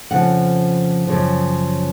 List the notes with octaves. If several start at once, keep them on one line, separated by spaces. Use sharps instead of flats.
F2 C#3 F3 F#5
F#2 C#3 F3